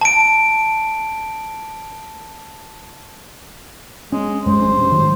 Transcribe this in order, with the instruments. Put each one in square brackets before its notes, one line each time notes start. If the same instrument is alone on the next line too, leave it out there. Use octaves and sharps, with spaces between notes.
[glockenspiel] A5 D7
[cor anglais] G#3 [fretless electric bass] C#4
[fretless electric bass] F#2 G#3 [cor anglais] C5
[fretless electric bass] G#1 G#3 C#4
D#1 G2
G#2 D#3 F#3